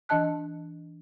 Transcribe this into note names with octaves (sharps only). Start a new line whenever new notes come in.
E3 D4 D#5 A5 F#6